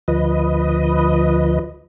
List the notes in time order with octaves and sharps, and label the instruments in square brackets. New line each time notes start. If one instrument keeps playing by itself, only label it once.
[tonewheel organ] D2 F3 B4 D#5